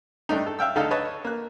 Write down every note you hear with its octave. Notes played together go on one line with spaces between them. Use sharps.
G2 A3 D4 D#4
A4
E5 F5 G5 E6
D2 D3 D#4 A4 F5
B4 C#5 D#5 A5
A#3 F#6